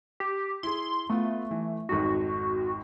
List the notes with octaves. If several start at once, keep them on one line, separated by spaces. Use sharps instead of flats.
G4
E4 G#4 C6
A3 B3 F4
E3
G#1 F2 G#2 F#4